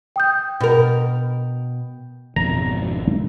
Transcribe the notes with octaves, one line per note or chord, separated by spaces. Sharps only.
G5 D#6 G6
B2 A#4
G#1 F2 B2 A#5